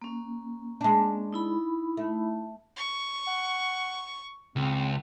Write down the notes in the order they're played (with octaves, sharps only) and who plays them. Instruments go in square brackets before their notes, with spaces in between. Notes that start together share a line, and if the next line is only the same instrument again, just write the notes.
[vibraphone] A#3 C#4
[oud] G#3 D4
[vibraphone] D#4 E4 B5
[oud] A3
[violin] C#6
[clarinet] F#5
[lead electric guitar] C#2 [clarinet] C4